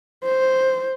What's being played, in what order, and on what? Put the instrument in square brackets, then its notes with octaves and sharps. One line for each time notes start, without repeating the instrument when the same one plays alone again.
[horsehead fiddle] C5